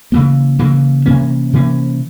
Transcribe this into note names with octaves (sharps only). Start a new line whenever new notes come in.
C#3 E3 A#3
C#3 E3 A#3
C3 E3 A#3 C#4
C3 E3 A#3 C#4